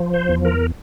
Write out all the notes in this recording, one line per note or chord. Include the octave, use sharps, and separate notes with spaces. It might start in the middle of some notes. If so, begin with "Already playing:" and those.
Already playing: F3
C5
E2
A#4